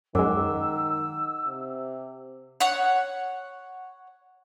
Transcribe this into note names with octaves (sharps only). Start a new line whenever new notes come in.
F#2 D#3 G#3 F#5 D6 E6
C3
C#5 F#5